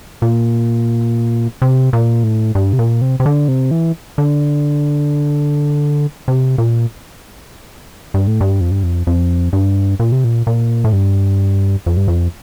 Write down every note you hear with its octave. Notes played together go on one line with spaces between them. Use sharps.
A#2
C3
A#2
A2
G2
C3
A#2
C3
C3
D3
C3
E3
D3
C3
A#2
G2
A2
G2
F2
G2
F2
F2
G2
A#2
C3
A#2
A#2
A2
G2
F2
G2
F2